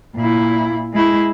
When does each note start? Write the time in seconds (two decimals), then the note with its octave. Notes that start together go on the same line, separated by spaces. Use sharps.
0.16 A#2 E4
0.93 G#3 E4